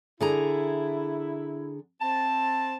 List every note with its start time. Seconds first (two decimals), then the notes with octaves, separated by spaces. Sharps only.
0.21 D3 E4 G#4 A#5
2.01 C4 A5